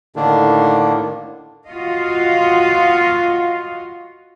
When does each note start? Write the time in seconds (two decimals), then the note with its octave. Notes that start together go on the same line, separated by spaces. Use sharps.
0.16 A2 D3 D#3 A#3 D4
1.67 F4 F#4 D#5 F5